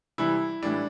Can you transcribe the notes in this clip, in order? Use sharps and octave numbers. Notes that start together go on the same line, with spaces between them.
C3 E3 G3 E4
A2 E3 G3 D4